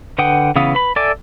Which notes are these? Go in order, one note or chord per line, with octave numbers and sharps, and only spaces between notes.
D3 B4 F#5 G5 D#6
C#3 E3 B3 F5 D#6
B4 B5
A4 D5 E5 G#5 D6